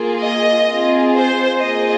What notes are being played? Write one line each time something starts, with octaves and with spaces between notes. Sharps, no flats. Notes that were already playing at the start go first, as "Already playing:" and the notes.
Already playing: A#3 F4 G#4
D#5
C4 F4 G#4
C5
A#3 F4 G#4 D#5